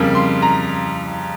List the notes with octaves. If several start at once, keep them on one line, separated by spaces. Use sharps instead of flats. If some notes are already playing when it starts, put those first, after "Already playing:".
Already playing: F2 C#3 G3 A#3
C6
A#5